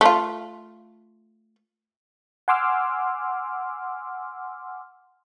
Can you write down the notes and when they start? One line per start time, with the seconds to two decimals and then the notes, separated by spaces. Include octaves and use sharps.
0.01 A3 F4
2.48 F#5 G#5 C6 D6 E6 F6